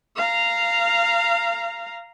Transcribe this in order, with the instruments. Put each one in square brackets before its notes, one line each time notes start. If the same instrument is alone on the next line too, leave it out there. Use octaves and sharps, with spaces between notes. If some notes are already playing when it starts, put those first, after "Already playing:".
[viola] F5 A#5